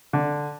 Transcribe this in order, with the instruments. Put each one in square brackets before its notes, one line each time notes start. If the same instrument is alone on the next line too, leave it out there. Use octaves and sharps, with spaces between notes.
[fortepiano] D3